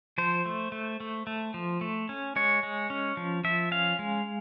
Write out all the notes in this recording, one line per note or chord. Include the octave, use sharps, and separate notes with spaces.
F3 C5
A3
A3
A3
A3
F3
A3
C#4
G#3 C#5
G#3
C#4
F3
F3 E5
C#4 F5
G#3